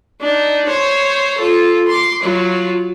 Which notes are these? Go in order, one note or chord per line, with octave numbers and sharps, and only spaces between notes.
D4 D#4
C5 C#5
F4 A4
C6 D6
F#3 F4